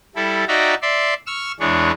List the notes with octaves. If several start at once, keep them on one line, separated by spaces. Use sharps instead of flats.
G3 E4 A4
D#4 F#4 D5 E5 G5 A#5
D5 E5 C6
C#6 E6 F6
E2 E3 G#3 D4 C#5